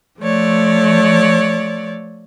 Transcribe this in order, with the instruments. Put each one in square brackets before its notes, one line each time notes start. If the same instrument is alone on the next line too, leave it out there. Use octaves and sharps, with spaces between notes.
[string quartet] F3 A3 C#5 D5